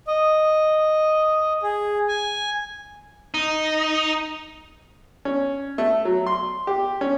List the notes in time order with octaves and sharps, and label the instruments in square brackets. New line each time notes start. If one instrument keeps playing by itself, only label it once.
[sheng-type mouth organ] D#5
G#4
G#5
[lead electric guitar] D#4
[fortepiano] C#4
A3
F#3
C6
G4
C#4